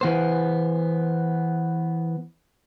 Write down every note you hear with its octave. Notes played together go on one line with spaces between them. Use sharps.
E3 B3 C5